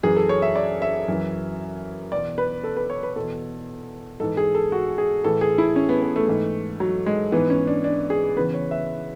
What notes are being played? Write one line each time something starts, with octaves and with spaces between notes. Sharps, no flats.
F#2 E3 G#4
A4
C#5
E5
D5
E5
F#2 E3
E2 B2 D5
B4
A4
B4
C#5
B4
E2 B2 A4
G#2 E3 A4
G#4
A4
F#4
G#4
A2 E3 A4
G#4
E4
C#4
B3
B3
A3
G#2 E3
F#3
G#3
G#2 E3 B3
C#4
D4
D4
G#4
E2 C#3 E3 B4
C#5
E5